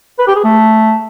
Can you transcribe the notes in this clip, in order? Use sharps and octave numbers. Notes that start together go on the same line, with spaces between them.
B4
G4
G#4
A3